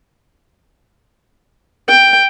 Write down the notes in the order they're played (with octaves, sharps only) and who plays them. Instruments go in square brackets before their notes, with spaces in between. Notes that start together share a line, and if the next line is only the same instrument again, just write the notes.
[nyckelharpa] G5